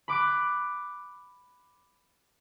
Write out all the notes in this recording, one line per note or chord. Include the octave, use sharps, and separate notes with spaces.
B5 D6 F#6 D7